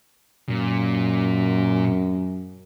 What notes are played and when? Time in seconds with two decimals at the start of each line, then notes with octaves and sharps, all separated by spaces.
0.49 F#2 A#2